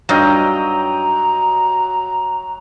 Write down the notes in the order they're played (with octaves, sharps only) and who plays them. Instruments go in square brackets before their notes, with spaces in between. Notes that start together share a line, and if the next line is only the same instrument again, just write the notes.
[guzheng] G2 D#4 F4 [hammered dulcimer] F#3 D#5 G5 [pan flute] A#5